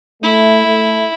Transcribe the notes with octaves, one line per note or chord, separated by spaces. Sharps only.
A3 E4
A3